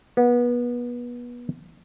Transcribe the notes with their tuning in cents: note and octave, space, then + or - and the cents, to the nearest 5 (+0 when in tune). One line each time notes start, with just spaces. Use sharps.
B3 -25